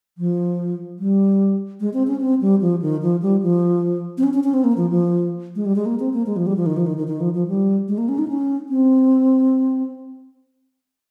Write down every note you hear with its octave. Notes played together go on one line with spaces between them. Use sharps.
F3
G3
G#3
C4
C#4
C4
G3
F3
D#3
F3
G3
F3
C4
C#4
C#4
C#4
C4
A#3
F3
F3
G#3
G3
G#3
A#3
C4
A#3
G#3
F3
G3
F3
D#3
F3
D#3
D#3
D#3
F3
F3
G3
G#3
A#3
C#4
D#4
C#4
C4